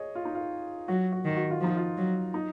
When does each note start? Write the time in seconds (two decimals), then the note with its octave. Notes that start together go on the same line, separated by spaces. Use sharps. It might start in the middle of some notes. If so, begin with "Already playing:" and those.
Already playing: G#4 C#5 D#5
0.15 F4
0.25 D#4
0.35 F4
0.88 F#3 F#4
1.12 F#4
1.25 D#3
1.37 F#4
1.51 F4
1.61 F3 D#4
1.77 F4
1.97 F#3
2.34 D#4